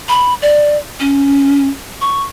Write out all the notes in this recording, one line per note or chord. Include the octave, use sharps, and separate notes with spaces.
B5
D5
C#4
C#6